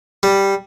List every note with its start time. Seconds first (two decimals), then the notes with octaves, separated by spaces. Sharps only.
0.23 G3